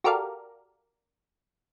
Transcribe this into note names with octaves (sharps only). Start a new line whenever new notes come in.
F#4 G4 A4 A#4 D5 F5